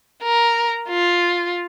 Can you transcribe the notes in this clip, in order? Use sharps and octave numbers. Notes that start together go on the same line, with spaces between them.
A#4
F4